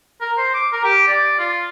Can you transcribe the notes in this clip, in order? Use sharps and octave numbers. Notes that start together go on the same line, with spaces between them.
A#4
C5
D6
A#4
G4
D5
F4